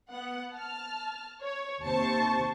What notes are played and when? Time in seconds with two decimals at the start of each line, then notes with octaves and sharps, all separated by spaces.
0.12 B3 F#5
0.55 A5 F6
1.42 C#5
1.83 D#2 C3 C5 A5 C#6